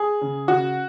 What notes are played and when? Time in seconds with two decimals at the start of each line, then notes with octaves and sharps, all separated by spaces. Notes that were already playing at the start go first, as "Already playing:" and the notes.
Already playing: G#4
0.21 C#3
0.48 C#3 F#4